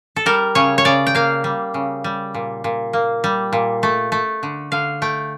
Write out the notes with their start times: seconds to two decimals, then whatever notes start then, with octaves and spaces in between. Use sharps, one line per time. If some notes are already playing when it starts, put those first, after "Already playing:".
0.16 A4
0.26 G3 A#4
0.55 C#3 C#5
0.78 C#5
0.85 C#3 D5
1.07 G5
1.15 A#3 F5
1.44 G3
1.74 C#3
2.04 G3
2.35 A#2
2.64 A#2
2.93 A#3
3.24 G3
3.53 A#2
3.83 A3
4.12 A3
4.43 D3
4.72 D3 F5
5.02 A3 G5